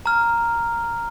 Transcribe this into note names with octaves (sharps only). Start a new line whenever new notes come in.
A#5 F6